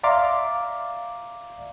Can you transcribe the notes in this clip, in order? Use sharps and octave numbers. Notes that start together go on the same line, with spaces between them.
D5 E5 F5 A#5 C6 D6